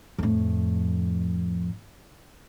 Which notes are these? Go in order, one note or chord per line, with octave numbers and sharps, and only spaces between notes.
F2 A2